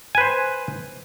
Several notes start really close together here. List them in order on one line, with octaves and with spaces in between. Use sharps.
G#5 B4 C5